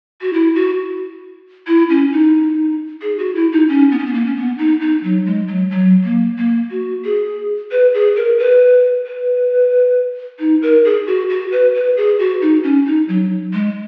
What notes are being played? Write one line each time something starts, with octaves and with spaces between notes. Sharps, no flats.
F#4
E4
F#4
E4
C#4
D#4
G#4
F#4
E4
D#4
C#4
B3
C#4
B3
A#3
C#4
B3
D#4
D#4
F#3
G#3
F#3
F#3
A#3
A#3
F#4
G#4
B4
G#4
A#4
B4
B4
D#4
A#4
G#4
F#4
F#4
B4
B4
G#4
F#4
D#4
C#4
D#4
F#3
G#3